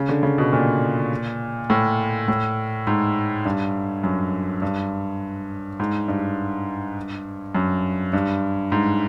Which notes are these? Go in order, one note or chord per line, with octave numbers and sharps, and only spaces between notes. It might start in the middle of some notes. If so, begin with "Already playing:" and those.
Already playing: C#3
D3
C#3
B2
A#2
A2
A2
G#2
G2
F#2
G2
G#2
G2
F#2
G2
G#2